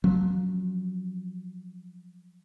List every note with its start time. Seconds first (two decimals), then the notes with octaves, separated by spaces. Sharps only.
0.04 F3 F#3 C#4